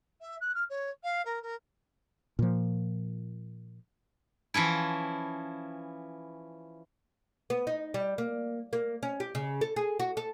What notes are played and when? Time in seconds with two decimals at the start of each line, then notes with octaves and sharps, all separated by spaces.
0.21 E5
0.41 F#6
0.55 F6
0.69 C#5
1.03 F5
1.25 A#4
1.42 A#4
2.39 A#2 F3
4.54 E3 F3 C#4 E4
7.50 B3
7.67 D#4
7.94 G3
8.18 A#3
8.73 A#3
9.03 C#4
9.20 G4
9.35 C#3
9.61 A4
9.76 G#4
9.99 F#4
10.17 A4